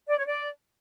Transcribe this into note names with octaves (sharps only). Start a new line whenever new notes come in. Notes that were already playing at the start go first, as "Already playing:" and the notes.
D5
C#5
D5